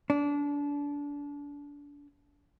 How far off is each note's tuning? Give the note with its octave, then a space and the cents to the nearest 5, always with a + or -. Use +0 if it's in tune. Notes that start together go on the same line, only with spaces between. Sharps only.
D4 -30